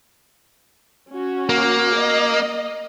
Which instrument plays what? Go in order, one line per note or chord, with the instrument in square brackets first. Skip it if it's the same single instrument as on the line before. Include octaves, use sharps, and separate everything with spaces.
[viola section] C#4 F#4
[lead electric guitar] A#3
[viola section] D#5